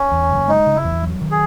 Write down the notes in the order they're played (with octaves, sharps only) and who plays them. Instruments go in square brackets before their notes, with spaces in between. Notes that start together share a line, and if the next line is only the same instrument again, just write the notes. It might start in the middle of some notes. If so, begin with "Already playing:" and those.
Already playing: [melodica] C#4
[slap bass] E2
F#1
[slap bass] G#3 [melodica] D#4
[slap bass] C#3
[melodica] E4
[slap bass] E2
F#3
D#3
[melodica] G#4